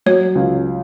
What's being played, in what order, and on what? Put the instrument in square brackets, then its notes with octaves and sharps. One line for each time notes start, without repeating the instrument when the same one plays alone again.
[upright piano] F#3 [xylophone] C#5
[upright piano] C#2